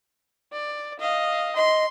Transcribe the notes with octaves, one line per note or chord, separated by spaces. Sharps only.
D5
D#5 F5
D#5 C6